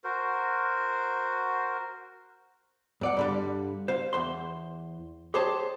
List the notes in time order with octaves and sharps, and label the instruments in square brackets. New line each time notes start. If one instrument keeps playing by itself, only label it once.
[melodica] F#4 A#4 C5
[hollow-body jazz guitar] F#2 D5 F#5
G2 D3 G3
C5 F5
E2 C5 C6
G4 G#4 C5 C#5 A5